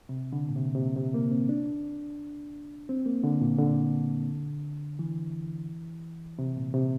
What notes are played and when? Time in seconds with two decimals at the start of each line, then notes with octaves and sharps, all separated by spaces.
0.09 C3
0.33 D3
0.49 A#2
0.56 C3
0.75 C3
0.78 A#2
0.96 C3
1.14 A#3
1.31 C4
1.49 D4
2.89 C4
3.06 A#3
3.24 D3
3.41 A#2
3.59 D3
4.99 E3
6.39 C3
6.56 A#2
6.73 C3